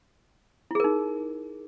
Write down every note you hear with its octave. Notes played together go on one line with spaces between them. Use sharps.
D#4 E4 G#4 A#4